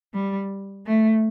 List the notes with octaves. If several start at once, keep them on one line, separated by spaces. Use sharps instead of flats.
G3
A3